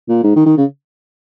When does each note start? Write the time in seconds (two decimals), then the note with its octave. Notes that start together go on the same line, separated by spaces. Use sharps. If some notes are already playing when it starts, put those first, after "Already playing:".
0.09 A#2
0.23 G#2
0.36 D#3
0.46 D#3
0.58 C#3